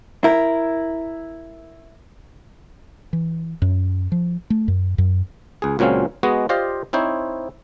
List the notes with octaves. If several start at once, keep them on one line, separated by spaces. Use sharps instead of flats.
E4 A#4
E3
F#2
F3
A3
F#2
F#2
C#2 G#4
C#2 A#2 F#3 C4 C#4 F5
G#3 B3 F#4 G#4 D#5
F4 G4 C5 D5 D#5 F5
C4 D#4 E4 C5 C#5